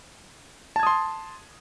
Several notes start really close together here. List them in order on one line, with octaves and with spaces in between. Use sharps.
A5 G#6 D#6 C6